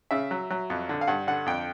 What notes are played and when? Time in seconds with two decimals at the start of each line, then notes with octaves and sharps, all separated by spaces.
0.11 C#3 E5
0.31 F#3
0.50 F#3
0.70 F2
0.89 D3
1.01 F5
1.07 G2 F#5
1.27 D3 F#5
1.46 F2 G5